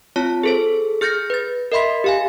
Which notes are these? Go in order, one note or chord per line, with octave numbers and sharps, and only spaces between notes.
C4 F4 C#5 A5
G#4 A4 C5
G#4 F6 G6 A6 A#6 C#7
B4 A6
A#4 D#5 E5 B5 C6 B6
G4 F5 G#5